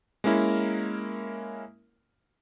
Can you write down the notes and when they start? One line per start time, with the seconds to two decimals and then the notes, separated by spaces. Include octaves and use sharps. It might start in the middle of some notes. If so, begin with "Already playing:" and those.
0.24 G#3 A#3 C#4 E4 A#4